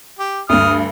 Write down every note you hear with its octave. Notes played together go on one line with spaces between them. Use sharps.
G4
D2 G2 D#6 F6